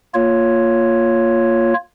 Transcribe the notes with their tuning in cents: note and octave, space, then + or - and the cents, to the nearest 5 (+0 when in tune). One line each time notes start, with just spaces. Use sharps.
A#3 +0 F4 +0 C#5 +0